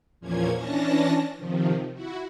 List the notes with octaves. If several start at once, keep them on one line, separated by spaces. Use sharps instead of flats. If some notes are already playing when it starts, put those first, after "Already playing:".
E2 A#2 F3 A#3 C#4 G#6
E3 C#4 D4 A5 A#6
C3 D#3 F3
E4 F#4